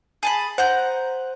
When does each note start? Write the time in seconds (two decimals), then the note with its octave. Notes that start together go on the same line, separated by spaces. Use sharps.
0.23 G#4 A5 B5
0.58 C5 F#5 A#5 G6